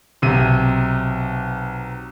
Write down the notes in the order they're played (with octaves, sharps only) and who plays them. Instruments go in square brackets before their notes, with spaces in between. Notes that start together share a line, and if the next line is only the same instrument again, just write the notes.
[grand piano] B1 C3 D#7